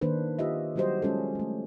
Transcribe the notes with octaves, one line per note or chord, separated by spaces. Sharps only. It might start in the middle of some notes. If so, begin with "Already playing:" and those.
D#3 A#3 D4 B4 C5
F4 G4 D#5 E5
F#3 G3 F#4 G4 C5 D#5
G#3 C#4 F4 A4
G#3 A3